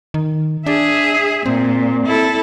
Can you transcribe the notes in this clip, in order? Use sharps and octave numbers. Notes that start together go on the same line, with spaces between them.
D#3
D4 G#4 E5
A#2 C4
E4 A4